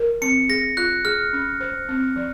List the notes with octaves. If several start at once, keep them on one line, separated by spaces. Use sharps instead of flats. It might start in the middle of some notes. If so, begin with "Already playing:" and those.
Already playing: A#4
C4 C#7
G#4 A#6
F4 F#6
G#4 F6
C#4
C5
C4
F3